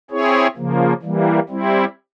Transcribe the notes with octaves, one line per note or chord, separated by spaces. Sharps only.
C4 E4 G#4 C#5
C#3 F3 A#3
E3 G3 A#3
G3 C4 E4